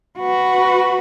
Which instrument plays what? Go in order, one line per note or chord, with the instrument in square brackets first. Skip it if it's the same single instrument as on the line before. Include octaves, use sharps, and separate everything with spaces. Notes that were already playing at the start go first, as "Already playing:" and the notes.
[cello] F#4 B4